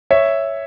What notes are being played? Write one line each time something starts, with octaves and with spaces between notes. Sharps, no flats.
C#5 E5